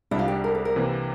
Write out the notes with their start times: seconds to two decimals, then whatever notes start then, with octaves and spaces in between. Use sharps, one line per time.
0.11 C2 C3 G3 D4 E4
0.19 F4
0.28 G4
0.44 A#4
0.55 A4
0.65 A#4
0.76 C3 E3 A#3